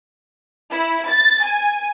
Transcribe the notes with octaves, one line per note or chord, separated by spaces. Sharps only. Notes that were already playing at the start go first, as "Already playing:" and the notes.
E4
A6
G#5